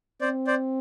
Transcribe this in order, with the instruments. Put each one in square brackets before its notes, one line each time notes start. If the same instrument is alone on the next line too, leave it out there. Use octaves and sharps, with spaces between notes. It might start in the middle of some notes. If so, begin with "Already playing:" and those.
[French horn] C4 [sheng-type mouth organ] C5 D5
[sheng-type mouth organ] C5 D5